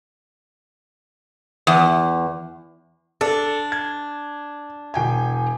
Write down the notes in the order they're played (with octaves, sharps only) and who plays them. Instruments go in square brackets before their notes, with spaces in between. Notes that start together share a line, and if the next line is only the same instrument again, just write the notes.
[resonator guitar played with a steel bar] E2
[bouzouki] D4 [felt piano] A4
[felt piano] G#6
E1 G5 G#5